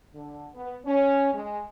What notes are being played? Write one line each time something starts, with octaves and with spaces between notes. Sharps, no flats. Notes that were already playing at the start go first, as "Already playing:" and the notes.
D3
B3
C#4
G#3